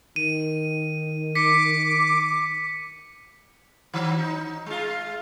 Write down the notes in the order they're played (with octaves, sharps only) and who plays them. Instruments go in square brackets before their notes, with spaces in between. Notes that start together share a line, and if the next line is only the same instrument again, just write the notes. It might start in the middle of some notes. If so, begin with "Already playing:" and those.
[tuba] D#3 [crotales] D#7
[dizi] D6 [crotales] B6 C#7
[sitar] D#3 F#3
D#4
G#3 F4